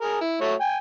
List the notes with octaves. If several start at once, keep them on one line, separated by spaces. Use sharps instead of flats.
G#4 A#4
E4
A3 F#4 C#5
G5 G#5